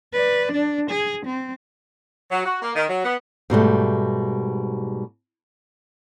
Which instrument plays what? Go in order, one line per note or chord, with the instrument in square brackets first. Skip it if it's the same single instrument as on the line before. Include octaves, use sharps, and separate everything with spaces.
[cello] B4 D5
D4
G#4
C4
[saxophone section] F#3
F#4
A#3
D#3
F#3
B3
[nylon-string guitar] G#2 B2 G3 A3